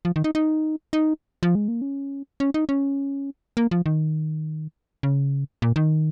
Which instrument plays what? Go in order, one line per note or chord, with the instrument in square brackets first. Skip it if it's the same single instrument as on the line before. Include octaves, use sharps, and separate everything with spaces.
[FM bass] F3
D#3
D#4
D#4
D#4
F3
G#3
A#3
C#4
C#4
D#4
C#4
A#3
F3
D#3
C#3
A#2
D#3